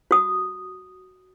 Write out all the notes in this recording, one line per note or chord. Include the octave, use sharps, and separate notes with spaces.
F#4 D#6